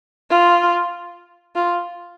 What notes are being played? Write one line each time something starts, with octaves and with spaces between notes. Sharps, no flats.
F4
F4